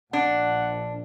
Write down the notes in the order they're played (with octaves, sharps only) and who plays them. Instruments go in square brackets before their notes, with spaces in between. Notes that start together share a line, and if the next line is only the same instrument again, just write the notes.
[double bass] A#1 [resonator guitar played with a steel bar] D4 [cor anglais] F#5